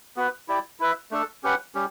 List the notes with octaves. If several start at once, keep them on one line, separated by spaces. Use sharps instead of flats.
B3 F#4 B4
E4 G4 D5
E4 B4 E5
A3 D4 A4
C#4 G4 B4 F#5
G3 C#4 G4